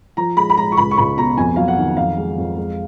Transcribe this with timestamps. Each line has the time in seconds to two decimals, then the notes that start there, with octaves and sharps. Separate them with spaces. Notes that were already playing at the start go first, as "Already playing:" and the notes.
0.17 F3 A#5
0.36 G#3 B5
0.50 B5
0.57 G#3 A#5
0.72 C#6
0.77 C#2 B5
0.91 C#6
0.97 C#2 B5
1.17 B2 A#5
1.38 F2 G#5
1.56 F#3 F5
1.68 F#5
1.78 D#3
1.97 F2 F5
2.17 G#3
2.38 F2
2.57 G#3